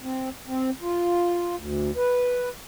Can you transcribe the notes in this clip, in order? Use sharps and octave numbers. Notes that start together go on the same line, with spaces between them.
C4
C4
F4
D2
B4